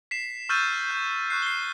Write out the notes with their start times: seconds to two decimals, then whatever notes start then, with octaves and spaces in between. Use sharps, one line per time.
0.11 B6 C7 E7
0.49 C#6 E6 F6 G6 A6 D#7
0.91 G6
1.30 C#6 F#6 C7
1.42 C7 G7